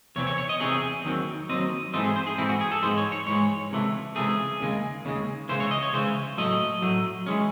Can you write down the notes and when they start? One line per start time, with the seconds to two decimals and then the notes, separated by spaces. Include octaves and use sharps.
0.16 E2 C3 E3 C4 C#5
0.27 C#5
0.38 C#5
0.49 D#5
0.60 E2 C3 E3 C4 G#4
1.05 D#2 D#3 F#3 C4
1.49 D#2 D#3 F#3 C4 D#5
1.93 G#2 E3 A3 C4 D#5
2.05 G#4
2.16 C5
2.27 G#4
2.38 G#2 E3 A3 C4 E4
2.49 F#4
2.61 G#4
2.72 A4
2.82 G#2 E3 G#3 C5
2.98 C#5
3.12 C#5
3.27 G#2 E3 G#3 C#5
3.71 C#2 C3 E3 A3
4.15 C#2 C3 E3 A3 G#4
4.60 D#2 C#3 G#3
5.05 D#2 C#3 G#3
5.49 C#2 C#3 E3 C5
5.60 C#5
5.71 D#5
5.83 C#5
5.93 C#2 C#3 E3 C5
6.38 A2 F#3 A3 D#5
6.82 A2 F#3 A3
7.26 E3 G#3 C#4